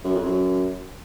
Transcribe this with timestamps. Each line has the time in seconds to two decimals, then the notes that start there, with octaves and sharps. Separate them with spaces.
0.04 F#2
0.15 F2
0.25 F#2